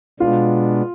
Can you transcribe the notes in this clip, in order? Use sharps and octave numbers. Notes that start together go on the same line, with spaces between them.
B2 G#3 B3 D4 F4